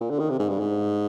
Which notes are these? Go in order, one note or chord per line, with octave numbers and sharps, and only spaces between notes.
A#2
D3
D#3
C3
G#2
G2
G#2